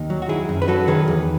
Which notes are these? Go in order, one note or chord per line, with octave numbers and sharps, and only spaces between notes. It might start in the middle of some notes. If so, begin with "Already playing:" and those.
Already playing: D#2 D#4
F#3
F#4
D#3 E4 G#4
F#2
B4
F#3 F#4 A4
D#3 G#4 B4
E2